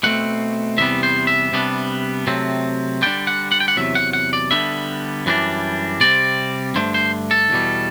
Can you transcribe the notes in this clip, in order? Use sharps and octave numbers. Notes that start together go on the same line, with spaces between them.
B2 A3 C4 F#5
E2 C3 G3 B3 E5
C5
E5
C3 G3 B3 D4
C3 F#3 A3 C4
D3 G3 D4 G5
F#5
F#5
G5
F#5
E2 C3 F#3 E5
F#5
F#5
D5
D3 G3 B3 D4 E5
F#2 E3 G3 B3 D4
C3 G3 C4 D5
G2 D3 A3 D4 C5
C5
A4
E2 B2 G3